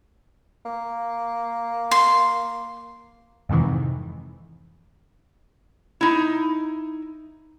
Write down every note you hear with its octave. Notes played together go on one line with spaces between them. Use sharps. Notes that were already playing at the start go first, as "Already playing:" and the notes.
A#3
C6
F2 G#2 C3 D#3 E3
D#4 E4